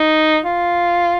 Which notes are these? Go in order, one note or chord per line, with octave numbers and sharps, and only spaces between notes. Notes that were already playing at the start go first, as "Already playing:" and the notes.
Already playing: D#4
F4